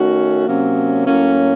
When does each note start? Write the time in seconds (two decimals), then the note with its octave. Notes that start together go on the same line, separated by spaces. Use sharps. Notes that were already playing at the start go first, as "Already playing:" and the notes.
Already playing: D#3 A3 C#4 F#4
0.47 C3 F#3 A#3 C#4
1.06 A2 F#3 A#3 C#4